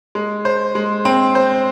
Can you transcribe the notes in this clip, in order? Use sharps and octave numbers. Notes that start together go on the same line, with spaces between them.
G#3
C5
G#3
C4
C5